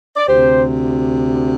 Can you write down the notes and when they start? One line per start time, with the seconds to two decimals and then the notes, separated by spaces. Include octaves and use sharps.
0.16 D5
0.27 D2 C3 G4 C5